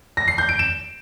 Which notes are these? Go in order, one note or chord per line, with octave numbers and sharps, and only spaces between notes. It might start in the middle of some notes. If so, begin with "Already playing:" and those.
A#6
C7
G6
D7
E7